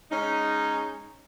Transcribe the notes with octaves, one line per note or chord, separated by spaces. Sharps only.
G#3 C#4 D#4